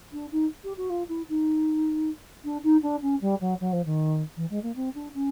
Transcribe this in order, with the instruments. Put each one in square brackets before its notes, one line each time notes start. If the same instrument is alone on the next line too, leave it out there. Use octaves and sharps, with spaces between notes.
[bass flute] D4
D#4
G4
F#4
F4
E4
D#4
D4
D#4
D4
C#4
G3
F#3
F#3
F3
D#3
E3
G#3
A#3
C4
D4
C#4